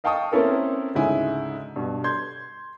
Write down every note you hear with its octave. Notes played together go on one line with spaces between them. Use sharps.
D#5 F5 G5 A5 C#6 D#6
A#3 C4 C#4 E4 A4 A#4
D2 G#2 C#3 E4 G#5
G2 B2
C6 G6 G#6